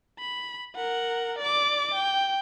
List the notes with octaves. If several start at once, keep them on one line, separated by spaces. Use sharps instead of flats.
B5
A#4 F#5
D5 D6
G5